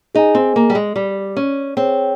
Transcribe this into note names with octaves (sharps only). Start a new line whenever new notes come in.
D#4 G#4 D#5 G#5
C4
A#3
G3
G#3
G3
C#4
C4 G#4 C#5 G5